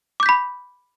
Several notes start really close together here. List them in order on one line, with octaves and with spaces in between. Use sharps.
D6 G6 B6 B5